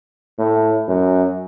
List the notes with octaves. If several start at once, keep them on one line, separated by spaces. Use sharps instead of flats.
A2
F#2